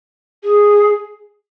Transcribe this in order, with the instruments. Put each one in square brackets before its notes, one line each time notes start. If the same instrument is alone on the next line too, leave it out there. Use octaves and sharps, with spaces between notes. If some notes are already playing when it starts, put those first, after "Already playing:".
[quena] G#4